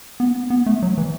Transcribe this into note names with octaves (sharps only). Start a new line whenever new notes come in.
B3
B3
A3
F#3
E3